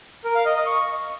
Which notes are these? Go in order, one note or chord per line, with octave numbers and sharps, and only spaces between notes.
A#4
F5
D#5
D#5
C#6